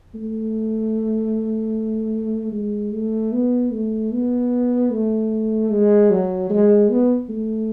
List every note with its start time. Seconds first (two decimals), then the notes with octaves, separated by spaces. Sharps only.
0.14 A3
2.52 G#3
2.92 A3
3.32 B3
3.72 A3
4.11 B3
4.91 A3
5.70 G#3
6.10 F#3
6.50 G#3
6.89 B3
7.29 A3